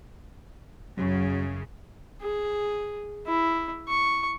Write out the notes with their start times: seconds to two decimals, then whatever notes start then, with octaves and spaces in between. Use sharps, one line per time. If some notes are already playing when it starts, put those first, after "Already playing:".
0.97 F#2 C#3 F#3
2.22 G#4
3.27 E4
3.88 C#6